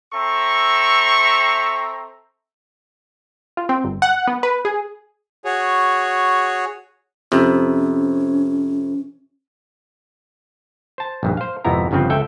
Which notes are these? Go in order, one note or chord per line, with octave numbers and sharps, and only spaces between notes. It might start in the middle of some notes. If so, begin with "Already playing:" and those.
C4 A4 E5 A#5 C#6
F4
C4
G1
F#5
B3
B4
G#4
F#4 G#4 C#5
F2 C3 C#4
C5 A5
A#1 G2 D#3
C5 F5
G#1 F2 C3 B3 E4 A#5
G1 G2 C#3 F3 C4 B4
C#2 A4 E5 G5